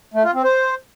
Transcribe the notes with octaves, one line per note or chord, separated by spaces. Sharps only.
A3
F4
C4
C5